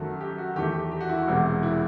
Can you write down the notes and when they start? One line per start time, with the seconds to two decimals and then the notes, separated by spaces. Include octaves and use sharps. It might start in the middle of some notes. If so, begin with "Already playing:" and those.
Already playing: F#2 D#3 A3 F#4
0.21 G4
0.38 F#4
0.56 E2 D#3 A3 G4
0.73 G4
0.91 G4
1.01 F#4
1.09 E4
1.18 F#4
1.27 E1 E2 C3
1.63 E4